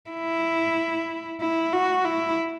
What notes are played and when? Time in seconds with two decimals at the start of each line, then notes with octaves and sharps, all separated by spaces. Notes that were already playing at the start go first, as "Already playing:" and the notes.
0.10 E4
1.41 E4
1.73 F#4
2.05 E4